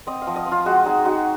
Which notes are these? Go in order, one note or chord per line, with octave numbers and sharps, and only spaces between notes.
C4 D#5
F5
F3
D#5
C4
F4
G#3 F#4
D#4 G#4
D#4 F#4